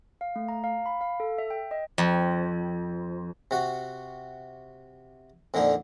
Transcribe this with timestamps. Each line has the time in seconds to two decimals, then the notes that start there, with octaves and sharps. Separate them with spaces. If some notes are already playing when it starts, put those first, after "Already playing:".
0.21 F5
0.36 A3
0.48 A#5
0.64 F5
0.86 B5
1.01 F5
1.20 A4
1.38 E5
1.50 G5
1.71 D#5
1.98 F2
3.51 C3 F#4
5.54 F2 A#2 D3 D#4